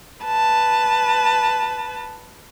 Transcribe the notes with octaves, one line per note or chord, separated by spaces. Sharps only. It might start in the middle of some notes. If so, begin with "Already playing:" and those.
B4 A5